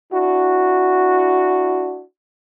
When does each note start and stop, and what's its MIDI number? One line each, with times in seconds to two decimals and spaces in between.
0.13 2.02 62
0.13 2.02 64
0.13 2.02 66